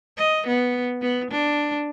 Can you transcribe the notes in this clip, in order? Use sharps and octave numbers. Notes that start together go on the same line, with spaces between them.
D#5
B3
B3
D4